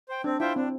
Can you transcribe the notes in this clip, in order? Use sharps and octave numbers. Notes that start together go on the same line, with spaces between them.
C5 G5
C4 D4
E4 F4 C5 E5 G5
C4 D4